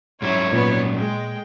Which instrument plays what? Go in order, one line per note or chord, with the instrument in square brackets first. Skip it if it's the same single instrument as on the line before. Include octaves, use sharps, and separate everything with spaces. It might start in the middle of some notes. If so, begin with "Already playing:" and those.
[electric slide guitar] G#2 F#3 C#4 [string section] E4 [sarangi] C#5
[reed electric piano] A#2 [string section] B3
[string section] G#3 [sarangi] G5